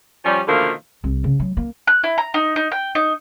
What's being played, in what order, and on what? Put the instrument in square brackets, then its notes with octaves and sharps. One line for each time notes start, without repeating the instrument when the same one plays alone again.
[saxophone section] F3 G3 C#4
B2 D3 D#3 F3 A3 A#3
[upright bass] C2
C#3
F#3
A#3
[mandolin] F#6
E4
A#5
D#4
D#4
G5
D#4